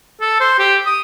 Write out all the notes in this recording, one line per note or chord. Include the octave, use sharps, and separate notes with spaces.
A4
C5
G4
D#6